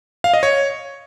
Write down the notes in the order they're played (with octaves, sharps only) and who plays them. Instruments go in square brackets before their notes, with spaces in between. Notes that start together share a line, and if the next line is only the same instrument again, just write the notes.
[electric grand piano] F5
D#5
C#5